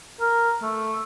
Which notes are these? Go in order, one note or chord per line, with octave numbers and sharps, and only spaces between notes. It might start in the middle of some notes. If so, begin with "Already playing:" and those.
A#4
A3